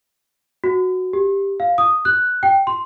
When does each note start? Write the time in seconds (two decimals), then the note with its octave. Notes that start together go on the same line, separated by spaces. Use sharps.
0.64 F#4
1.13 G4
1.60 F5
1.78 D#6
2.05 F#6
2.43 G5
2.67 C6